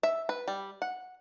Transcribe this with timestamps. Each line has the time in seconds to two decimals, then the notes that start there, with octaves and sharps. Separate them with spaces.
0.03 E5
0.29 B4
0.48 G3
0.82 F#5